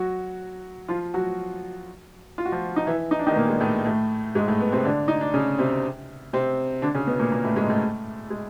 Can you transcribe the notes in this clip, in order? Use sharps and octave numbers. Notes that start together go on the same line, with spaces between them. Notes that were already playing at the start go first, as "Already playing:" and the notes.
Already playing: F#3 F#4
F3 F4
F#3 F#4
F4
F#4
F3 F4
D#4
E3 E4
D#4
D4
D#3 D#4
B3
A#2 A#3
G#3
A2 A3
A2 A3
G#2 G#3
A2 A3
B3
C3 C4
D3 D4
D#4
D4
C#3 C#4
C3 C4
C3 C4
D3 D4
C#3 C#4
B2 B3
A#2 A#3
A#2 A#3
A2 A3
G#2 G#3
A2 A3
G#3